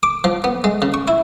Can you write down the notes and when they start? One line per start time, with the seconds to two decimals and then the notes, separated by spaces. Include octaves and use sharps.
0.03 D6
0.24 F3
0.44 B3
0.64 G#3
0.82 C#3
0.94 C#6
1.08 E4